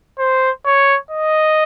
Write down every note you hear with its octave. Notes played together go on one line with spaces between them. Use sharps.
C5
C#5
D#5